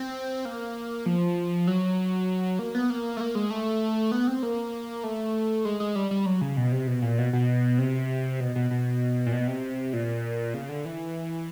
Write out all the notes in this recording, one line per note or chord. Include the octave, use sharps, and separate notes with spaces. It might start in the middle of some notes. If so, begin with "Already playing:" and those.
Already playing: C4
A#3
F3
F#3
A#3
B3
A#3
A3
A#3
G#3
A3
B3
C4
A#3
A3
G#3
G#3
G3
G3
F#3
C#3
B2
C3
B2
A#2
B2
B2
C3
B2
B2
B2
A#2
B2
C3
A#2
C#3
D3
E3